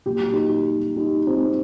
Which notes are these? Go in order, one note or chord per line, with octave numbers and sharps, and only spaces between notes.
A#2 F#3 G4
F#4
D#4 G4
D#4 G4
C4 D#4